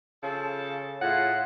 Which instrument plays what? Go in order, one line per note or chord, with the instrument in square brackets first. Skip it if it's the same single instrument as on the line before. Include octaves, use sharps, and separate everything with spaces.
[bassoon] C#3 [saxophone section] F3 A4
[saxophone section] A2 [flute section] F4 G#4 C#5 [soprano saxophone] F#5